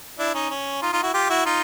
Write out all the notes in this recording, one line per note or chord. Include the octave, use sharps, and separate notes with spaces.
D4 E4
C#4 D#4
C#4
D#4 F4
D#4 F4
E4 F#4
F4 G4
E4 F#4
D#4 F4